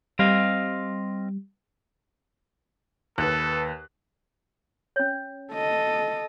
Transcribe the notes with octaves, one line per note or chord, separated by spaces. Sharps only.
G3 C4 D#5 F5
D#2 A4 B4 F#6
C#4 C#5
A4 D#5